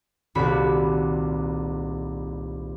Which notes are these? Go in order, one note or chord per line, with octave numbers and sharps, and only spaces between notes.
D#1 C2 F#4 B5